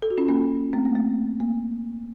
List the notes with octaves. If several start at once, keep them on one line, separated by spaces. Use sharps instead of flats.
A4
F#4
C#4 F4
A#3 C#4
A3 C4
A#3
A3
A#3